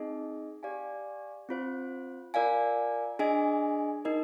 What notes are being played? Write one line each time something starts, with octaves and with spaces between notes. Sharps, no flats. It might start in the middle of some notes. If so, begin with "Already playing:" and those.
Already playing: C4 D#4 G#4 D#5
G4 D5 F5 G#5
C4 F4 C5
F4 A#4 D5 F5 G#5
D4 G#4 D#5 G#5
D#4 A#4 D#5